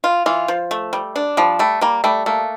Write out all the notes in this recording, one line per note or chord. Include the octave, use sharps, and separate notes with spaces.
F4
E3 F4
F3
A3
G3
D4
F3 G3
G3 A3
G3 A#3
G3 A3
A3 A#3